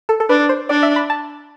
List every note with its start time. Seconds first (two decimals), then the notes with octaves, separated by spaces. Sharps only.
0.09 A4
0.20 A4
0.29 D4 B4
0.49 C5
0.69 D4 D5
0.83 E5
0.96 B5
1.10 A5